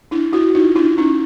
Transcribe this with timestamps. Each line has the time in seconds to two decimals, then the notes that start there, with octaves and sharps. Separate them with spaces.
0.11 D4 E4
0.32 E4 F#4
0.55 D#4 F4
0.76 D4 E4
0.97 C#4 D#4